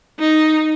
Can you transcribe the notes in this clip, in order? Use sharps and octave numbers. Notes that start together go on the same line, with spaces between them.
D#4